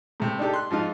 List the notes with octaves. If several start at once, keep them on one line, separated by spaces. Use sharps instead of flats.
A2 C3
D4 D#4 G4 A4
C6 F#6
G#2 F3 D#4 F4